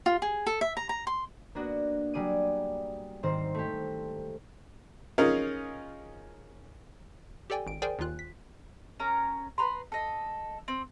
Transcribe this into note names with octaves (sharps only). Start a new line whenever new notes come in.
F4
G#4
A4
E5
A#5
A#5
C6
A#3 B3 D4 F#4
F#3 G3 G#4 D5 D#7
G#2 D#3 C4 C5
A3 G4
C#4 D#4 F4 G#4 A#4
G4 A4 D5 G5 G#5
G#1 D7
G#4 A#4 C5 D5 G5 G#5
D#2 D#3 F4 F#6
B6
C#4 A#4 A#5
B4 A#5 C6
A4 D#5
C4